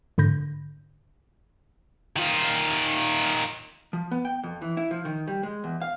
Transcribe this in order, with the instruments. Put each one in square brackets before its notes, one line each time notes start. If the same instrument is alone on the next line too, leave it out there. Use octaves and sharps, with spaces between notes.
[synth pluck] G#2 D3 B5 G6 A#6
[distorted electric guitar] D#3 F4
[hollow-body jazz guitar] F3
B3
G5
F2
E3
E4
F3
D#3
G3
G#3
E2
F5